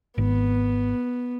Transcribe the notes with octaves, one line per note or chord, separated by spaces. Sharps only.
G#1 B3